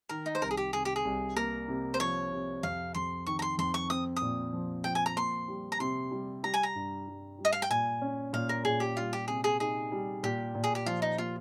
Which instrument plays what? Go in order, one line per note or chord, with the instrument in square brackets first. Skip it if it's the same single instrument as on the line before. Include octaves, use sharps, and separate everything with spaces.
[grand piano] D#3 [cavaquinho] A#4
[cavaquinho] D#4
C5
[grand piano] C2 [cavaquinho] A#4
[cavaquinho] G#4
G4
[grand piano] C3 [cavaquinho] G#4
[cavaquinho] G4
G#4
[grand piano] C2
[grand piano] A#3 [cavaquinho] A#4
[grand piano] C3
[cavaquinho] C5
[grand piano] F3 [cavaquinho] C#5
[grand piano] C3
[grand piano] F2 [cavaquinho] F5
[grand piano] F2 [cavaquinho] C6
[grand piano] D#3 [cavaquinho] C#6
[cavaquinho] A#5
C6
[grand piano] F2 [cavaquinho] C6
[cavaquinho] C#6
[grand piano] C4 [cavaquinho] D#6
[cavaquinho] D#6
[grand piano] A#2
F3
[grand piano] F3 [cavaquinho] G5
[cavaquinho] G#5
A#5
[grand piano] A#3 [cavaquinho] C6
[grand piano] G3
[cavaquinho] A#5
[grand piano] C3 [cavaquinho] C6
[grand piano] G3
[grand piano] G3 [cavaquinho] A#5
[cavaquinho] G#5
A#5
[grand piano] G2
G3
G3
[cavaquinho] D#5
F5
G5
[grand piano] A#2 [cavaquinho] G#5
[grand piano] C#4
[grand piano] A#2 [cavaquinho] F5
[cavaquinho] A#4
[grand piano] A#2 [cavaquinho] G#4
[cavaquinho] G4
[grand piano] G3 [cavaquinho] F4
[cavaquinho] G4
[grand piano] C3 [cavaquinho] G#4
[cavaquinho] G#4
[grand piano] D#4 [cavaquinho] G#4
[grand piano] G3
[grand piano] A#2 [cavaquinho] G4
[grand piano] A#2
[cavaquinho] G#4
G4
[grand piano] F3 [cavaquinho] F4
[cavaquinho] D#4
[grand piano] A#3 [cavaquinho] F4